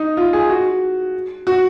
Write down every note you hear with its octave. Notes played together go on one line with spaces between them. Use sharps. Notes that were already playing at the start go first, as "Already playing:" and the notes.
Already playing: D#4
F4
G#4
F#4
F#4